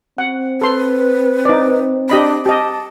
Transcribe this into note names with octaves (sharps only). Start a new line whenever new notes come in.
C4 F#5
A4 B4 C6
D#4 D5
D4 G4 D#5 B5
G4 D#5 A5